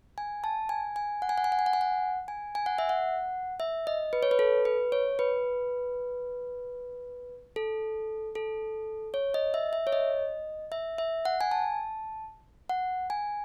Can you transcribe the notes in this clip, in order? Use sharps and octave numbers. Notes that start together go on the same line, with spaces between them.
G#5
A5
G#5
G#5
F#5
G#5
F#5
G#5
F#5
G#5
F#5
G#5
F#5
G#5
G#5
F#5
E5
F#5
E5
D#5
B4
C#5
B4
A4
B4
C#5
B4
A4
A4
C#5
D#5
E5
E5
C#5
D#5
E5
E5
F#5
G#5
A5
F#5
G#5